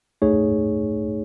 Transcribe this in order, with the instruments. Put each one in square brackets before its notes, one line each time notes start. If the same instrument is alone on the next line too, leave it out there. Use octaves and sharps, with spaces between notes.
[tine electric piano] A3 D#4 G#4 C#5